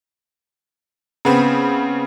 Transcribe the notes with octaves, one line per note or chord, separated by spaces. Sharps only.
C#3 B3 C4